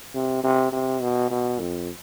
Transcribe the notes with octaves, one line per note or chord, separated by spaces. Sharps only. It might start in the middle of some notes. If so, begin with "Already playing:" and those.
C3
C3
C3
B2
B2
F2